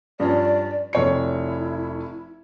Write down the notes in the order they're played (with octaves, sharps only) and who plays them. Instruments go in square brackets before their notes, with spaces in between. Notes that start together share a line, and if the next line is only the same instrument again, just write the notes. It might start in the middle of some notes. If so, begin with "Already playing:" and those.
[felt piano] G2 F3 C#4 [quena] D5
[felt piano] F1 C#5 C#7 [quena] E4